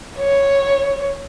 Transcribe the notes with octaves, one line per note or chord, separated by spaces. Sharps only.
C#5